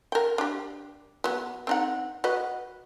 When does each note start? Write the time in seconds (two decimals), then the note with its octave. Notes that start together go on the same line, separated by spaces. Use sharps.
0.12 A#4 G5
0.38 D4 G4
1.24 F#3 B3
1.67 C4 D#4 F#5
2.24 F#4 B4 D#5